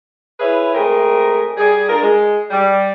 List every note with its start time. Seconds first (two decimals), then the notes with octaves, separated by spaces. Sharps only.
0.40 E4 G#4 B4 C#5 E5
0.74 G#3 A3 C4 G#4 A#4
1.57 G3 G#4
1.89 D4 F4 A#4
2.02 G#3
2.51 G3